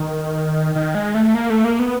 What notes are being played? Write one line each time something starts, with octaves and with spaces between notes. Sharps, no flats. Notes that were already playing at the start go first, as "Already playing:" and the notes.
Already playing: D#3
D#3
G#3
A3
A#3
A3
A#3
B3